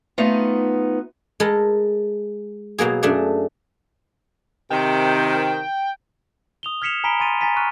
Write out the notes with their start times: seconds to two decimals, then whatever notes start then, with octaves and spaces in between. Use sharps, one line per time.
0.18 A3 B3 D#4 F4
1.40 G#3 A4 A#4 B5
2.78 B2 F#3 A#3 G#4
3.03 F#2 A3 D4 G#4
4.70 C3 D#3 G5
6.63 D#6 F7 G7
6.82 F6 G#6 B6 C#7 E7 F7
7.04 G#5 A#5 B5 B6 D7 G7
7.20 G#5 C6 A6 D#7 F7
7.41 G#5 A#5 A6 B6 D#7
7.56 C#6 F6 F#6 D#7